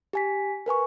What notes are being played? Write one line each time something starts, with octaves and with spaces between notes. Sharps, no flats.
G4 G#5 B6
A#4 B4 G#5 C#6